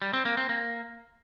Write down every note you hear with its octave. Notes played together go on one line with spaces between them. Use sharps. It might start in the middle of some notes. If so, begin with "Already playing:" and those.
G3
C4
A#3
C4
A#3